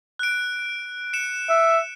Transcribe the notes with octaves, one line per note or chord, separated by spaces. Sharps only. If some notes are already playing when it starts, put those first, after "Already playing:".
F#6 D7
C#7 E7
E5